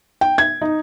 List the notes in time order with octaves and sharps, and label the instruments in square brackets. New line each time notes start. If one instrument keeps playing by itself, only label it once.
[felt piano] G5
G#6
D#4